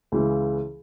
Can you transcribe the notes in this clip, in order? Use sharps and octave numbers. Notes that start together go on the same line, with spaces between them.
C#2 C#3 E3